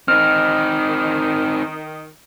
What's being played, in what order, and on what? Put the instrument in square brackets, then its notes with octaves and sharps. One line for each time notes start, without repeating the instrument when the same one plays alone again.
[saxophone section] D#3 [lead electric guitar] C4 D#4 [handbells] F6